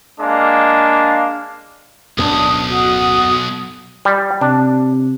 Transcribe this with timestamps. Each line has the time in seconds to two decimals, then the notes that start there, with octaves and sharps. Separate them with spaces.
0.19 G#3 A#3 D4 F5
2.18 D1 B1 F#2 B3 D4 D#6
2.69 F#4 D#6
4.05 G3
4.41 C3 D4